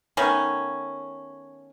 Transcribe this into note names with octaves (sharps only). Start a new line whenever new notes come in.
D#3 A3 B3 C#4